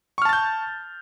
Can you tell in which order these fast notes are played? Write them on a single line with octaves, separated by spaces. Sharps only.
C#6 F6 A5 A6 G6